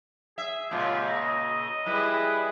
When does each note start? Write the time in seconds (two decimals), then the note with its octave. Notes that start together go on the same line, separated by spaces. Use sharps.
0.38 G#4 E5
0.71 A#2 C#3 G#3 F4 G4
1.09 D#5 A#5
1.86 G3 E4 G#4 B4